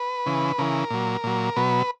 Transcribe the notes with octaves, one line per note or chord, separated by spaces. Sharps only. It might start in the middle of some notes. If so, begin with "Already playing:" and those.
Already playing: B4
C#3 E3
C#3 E3 A#4
A#2 F#3
A#2 F#3
B2 F#3 B4